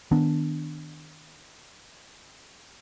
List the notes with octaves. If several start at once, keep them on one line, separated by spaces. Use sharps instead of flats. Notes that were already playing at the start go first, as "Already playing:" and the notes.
D#3 B3 D4